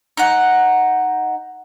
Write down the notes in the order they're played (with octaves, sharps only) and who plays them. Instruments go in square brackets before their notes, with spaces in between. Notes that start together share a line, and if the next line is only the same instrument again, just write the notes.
[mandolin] D#4 F#5